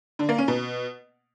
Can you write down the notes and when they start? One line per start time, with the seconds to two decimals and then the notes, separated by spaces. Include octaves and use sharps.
0.19 D3
0.29 A#3
0.38 C#4
0.48 B2